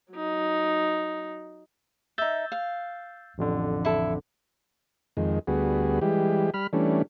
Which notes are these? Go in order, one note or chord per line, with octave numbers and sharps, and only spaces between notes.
F#3 D#4
D#4 E5 E6 G6 A6
F5
A1 F2 D3
E4 A4
F2 D#3 G#3
D2 G3 B3 F#4 G#4
E3 G3 G#3 G4
G3 B5 F6
E3 G3 A3 C#4 D4